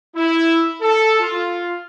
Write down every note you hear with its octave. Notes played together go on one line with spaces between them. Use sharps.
E4
A4
F4